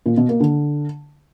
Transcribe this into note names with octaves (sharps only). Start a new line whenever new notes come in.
A#2
B2
A#3
D3